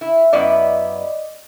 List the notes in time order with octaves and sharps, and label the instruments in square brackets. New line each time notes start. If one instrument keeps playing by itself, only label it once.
[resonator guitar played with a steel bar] E4
[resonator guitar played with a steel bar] F#2 B3 E4 [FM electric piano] D5 D#5